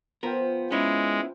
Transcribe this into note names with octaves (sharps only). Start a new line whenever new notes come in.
F3 B3 F4 A#4 G5
G#3 B3 C#4 E4